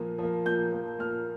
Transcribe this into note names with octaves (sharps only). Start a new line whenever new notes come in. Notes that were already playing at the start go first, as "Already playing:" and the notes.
Already playing: A#2 F3 A#3
F3 A#3
A#2 G6
F3 A#3
A#2 F6